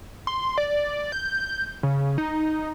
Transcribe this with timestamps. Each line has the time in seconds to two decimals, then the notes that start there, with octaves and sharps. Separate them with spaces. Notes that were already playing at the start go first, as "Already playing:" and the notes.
0.27 C6
0.58 D5
1.12 G6
1.83 C#3
2.18 D#4